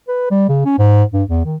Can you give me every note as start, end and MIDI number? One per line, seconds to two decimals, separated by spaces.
0.08 0.26 71
0.31 0.48 55
0.49 0.63 49
0.65 0.74 61
0.79 1.03 44
1.14 1.23 43
1.28 1.44 40
1.45 1.56 51